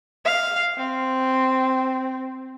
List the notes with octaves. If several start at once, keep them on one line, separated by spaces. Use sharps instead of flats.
F5
C4